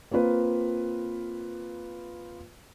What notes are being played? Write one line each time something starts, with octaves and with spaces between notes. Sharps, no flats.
A#3 C4 F4 B4